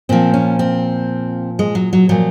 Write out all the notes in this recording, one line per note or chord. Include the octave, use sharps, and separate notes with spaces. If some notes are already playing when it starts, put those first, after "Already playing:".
A#2 F3 C4
C#4
C4
G#3
F#3
F#3
A#2 F3 F#3